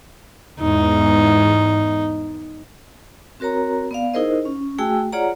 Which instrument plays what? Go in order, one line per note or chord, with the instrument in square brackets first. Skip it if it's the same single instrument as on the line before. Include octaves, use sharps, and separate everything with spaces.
[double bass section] E2 G#2 [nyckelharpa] D#4
[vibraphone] C4 F#4 A#4 C#5 A#5
B3 D5 F5
D#4 E4 G#4 A#4 C5 D#5
C#4
A3 F#4 G#4 G5 G#5 E6
F4 G#4 C#5 D5 F#5 A#5